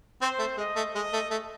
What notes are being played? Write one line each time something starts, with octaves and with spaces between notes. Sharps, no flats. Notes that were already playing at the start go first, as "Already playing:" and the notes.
C4 C5
A3
G#3 D#5
A3
G#3 D#5
A3
A3